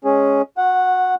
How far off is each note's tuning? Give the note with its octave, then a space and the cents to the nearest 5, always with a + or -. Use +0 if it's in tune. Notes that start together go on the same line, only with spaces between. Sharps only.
G#3 +0 C#4 +0 G#4 +0
F#4 -25 F#5 -5